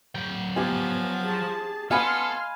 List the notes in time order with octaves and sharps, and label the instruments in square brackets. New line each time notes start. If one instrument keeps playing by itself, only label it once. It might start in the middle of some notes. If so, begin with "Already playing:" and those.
[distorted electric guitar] F#3 G5
[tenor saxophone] F3 [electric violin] B3 [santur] G4 G#5
[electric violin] G#4 A5
[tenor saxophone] B3 [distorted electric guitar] A4 [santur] F5 G#5 B5 [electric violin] C6 F6